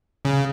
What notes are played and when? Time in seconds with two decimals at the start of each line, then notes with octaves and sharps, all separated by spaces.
0.25 C#3